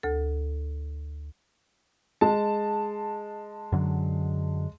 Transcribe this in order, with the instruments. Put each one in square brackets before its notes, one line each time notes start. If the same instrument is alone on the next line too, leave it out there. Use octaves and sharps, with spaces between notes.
[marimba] D2 A4
[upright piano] G#3 A5
[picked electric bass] F#2 D3 F#3